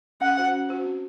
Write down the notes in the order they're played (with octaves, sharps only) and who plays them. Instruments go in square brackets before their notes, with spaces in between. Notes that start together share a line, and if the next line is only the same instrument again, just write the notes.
[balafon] C#4 [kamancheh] F#5
[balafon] F#4 C5
C#4
F#4 C5
C4